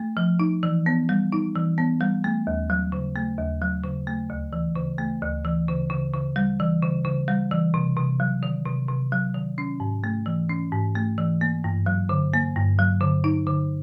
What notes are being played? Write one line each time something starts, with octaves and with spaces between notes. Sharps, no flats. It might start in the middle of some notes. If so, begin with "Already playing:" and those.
Already playing: A3
F3
D#4
E3
B3
G3
D#4
E3
B3
G3
A3
D#2
F#3
C#3
A3
D#2
F#3
C#3
A3
D2
E3
C#3
A3
D2
E3
C#3
C#3
C#3
G3
E3
C#3
C#3
G3
E3
C3
C3
F#3
D#3
C3
C3
F#3
D#3
C#4
G#2
A3
E3
C#4
G#2
A3
E3
A#3
G2
F#3
D3
A#3
G2
F#3
D3
D#4
D3